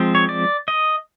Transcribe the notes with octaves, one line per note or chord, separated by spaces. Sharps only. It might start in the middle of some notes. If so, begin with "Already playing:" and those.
Already playing: F3 G#3 C4
C#5
D5
D#5